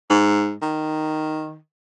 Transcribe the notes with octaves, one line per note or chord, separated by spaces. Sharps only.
G#2
D#3